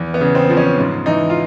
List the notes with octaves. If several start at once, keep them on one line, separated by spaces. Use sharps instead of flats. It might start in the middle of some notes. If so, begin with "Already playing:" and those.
Already playing: E2
B3
C#3
C4
F3
C#4
G#2
E3 D#4
F4